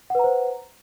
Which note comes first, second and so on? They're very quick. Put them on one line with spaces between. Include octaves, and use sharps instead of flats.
F#5 B4 A#5 C5